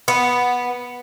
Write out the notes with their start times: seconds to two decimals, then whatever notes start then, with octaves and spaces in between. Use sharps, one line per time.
0.08 B3